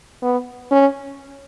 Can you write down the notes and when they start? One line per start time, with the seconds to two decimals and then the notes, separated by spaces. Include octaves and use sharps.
0.22 B3
0.71 C#4